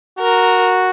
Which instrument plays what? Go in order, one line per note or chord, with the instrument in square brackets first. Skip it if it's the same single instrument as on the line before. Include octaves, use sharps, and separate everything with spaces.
[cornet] F#4 [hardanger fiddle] A#4